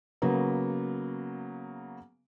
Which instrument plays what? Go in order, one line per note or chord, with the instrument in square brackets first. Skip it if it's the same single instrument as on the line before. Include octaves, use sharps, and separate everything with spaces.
[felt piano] C#3 F#3 A#3 B3